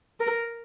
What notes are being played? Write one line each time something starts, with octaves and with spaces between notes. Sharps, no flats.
A#4